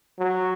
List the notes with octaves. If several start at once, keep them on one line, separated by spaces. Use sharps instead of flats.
F#3